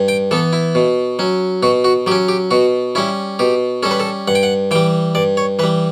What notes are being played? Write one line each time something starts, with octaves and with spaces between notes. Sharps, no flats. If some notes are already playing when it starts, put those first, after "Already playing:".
Already playing: G2
G5
E3 B3 A4
E4
B2
F#3 C#4
B2 F#4
F#4
F#3 C#4 G4
G4
B2 F#4
G3 C#4 E4
B2 G4
G3 C#4 A4
B4
A4
G2 F#5
G5
F#5
E3 G3 G5
G2 D5
C#5
E3 G3 B4